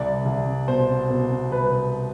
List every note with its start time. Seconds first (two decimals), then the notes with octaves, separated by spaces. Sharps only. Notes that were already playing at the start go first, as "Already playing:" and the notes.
Already playing: C2 D5
0.25 C2
0.68 B2 C5
1.10 B2
1.51 C2 B4